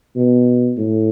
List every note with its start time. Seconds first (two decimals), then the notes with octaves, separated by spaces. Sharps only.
0.16 B2
0.78 A2